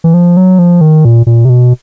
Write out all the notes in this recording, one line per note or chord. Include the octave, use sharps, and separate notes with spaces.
E3
F3
F#3
F3
D#3
A#2
A#2
C3
B2